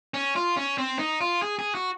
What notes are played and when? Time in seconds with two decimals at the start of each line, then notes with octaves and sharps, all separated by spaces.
0.14 C#4
0.36 F4
0.57 C#4
0.78 C4
0.99 D#4
1.21 F4
1.42 G#4
1.59 G#4
1.75 F#4